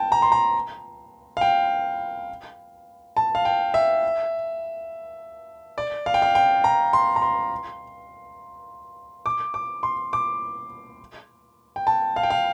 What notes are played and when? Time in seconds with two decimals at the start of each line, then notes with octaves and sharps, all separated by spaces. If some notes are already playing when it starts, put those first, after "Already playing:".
Already playing: G5 A5
0.12 A#5
0.22 C6
0.32 A#5
1.37 F5
1.41 G5
3.17 A5
3.35 F5
3.45 G5
3.74 E5
5.78 D5
6.06 F5
6.14 G5
6.22 F5
6.35 G5
6.64 A#5
6.93 C6
7.16 A#5
7.22 C6
9.26 D6
9.54 D6
9.83 C6
10.13 D6
11.76 G5
11.87 A5
12.16 F5
12.23 G5
12.30 F5